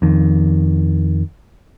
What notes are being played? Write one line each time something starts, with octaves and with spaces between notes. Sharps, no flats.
F2 D#3